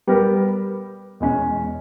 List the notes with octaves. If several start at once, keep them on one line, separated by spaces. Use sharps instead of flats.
G3 B3 G4 A#4
E2 B2 G#3 C#4